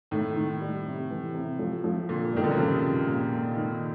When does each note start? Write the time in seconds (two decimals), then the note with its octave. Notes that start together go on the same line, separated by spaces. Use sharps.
0.11 A2 D#3
0.36 D#3
0.61 G3
0.85 C3
1.10 E3
1.34 C3
1.59 F3
1.84 F3
2.09 A#2 D3
2.33 G2 D#3
2.43 D3
2.51 C#3
2.57 C3 F3
2.82 C#3
3.07 A#2
3.32 A#2
3.56 D#3